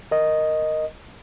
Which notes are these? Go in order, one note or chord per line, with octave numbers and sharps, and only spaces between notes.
A#4 D#5